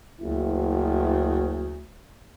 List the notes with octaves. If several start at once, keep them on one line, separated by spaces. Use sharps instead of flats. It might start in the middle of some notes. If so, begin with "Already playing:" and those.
F#1 D2 E4